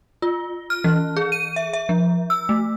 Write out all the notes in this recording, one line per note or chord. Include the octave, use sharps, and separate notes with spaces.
F4
F6
E3
G#4
D#7
E5
E5
F3
E6
A3